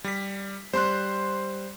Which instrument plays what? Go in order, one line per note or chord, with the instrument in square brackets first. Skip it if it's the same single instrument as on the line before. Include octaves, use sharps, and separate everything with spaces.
[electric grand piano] G3 B6
[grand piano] G3 [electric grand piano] C5 C6 F#6